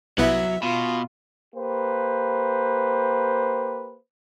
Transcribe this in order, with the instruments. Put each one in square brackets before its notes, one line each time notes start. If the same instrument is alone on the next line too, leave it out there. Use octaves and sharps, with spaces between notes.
[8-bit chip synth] C2 B3 E4 [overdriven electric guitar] F#3 [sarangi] E5
[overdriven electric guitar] B2 [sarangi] F4
[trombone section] A#3 G4 B4 C5